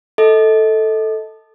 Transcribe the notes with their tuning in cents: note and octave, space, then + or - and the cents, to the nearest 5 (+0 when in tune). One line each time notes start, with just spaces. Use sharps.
A4 +0 D#5 +30